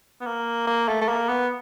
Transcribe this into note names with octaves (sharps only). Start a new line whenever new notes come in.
B3
A#3
A#3
A3
A3
A#3
B3